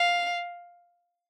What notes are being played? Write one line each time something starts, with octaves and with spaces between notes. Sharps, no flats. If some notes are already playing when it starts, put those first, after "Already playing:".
Already playing: F5